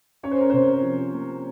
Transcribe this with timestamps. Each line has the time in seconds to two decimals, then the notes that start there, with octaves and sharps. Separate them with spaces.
0.23 C#4 C#5
0.31 C5
0.40 A#4
0.50 C3 C5
0.83 F3
1.13 A#3